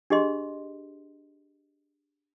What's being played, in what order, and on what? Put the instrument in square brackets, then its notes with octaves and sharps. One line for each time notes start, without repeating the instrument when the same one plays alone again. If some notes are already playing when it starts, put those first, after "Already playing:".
[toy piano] D4 G4 G#4 D#5 C6